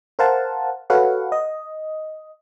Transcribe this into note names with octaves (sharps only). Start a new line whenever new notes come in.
A#4 C5 F5 F#5 A5
F#4 A4 B4 C#5 F5 F#5
D#5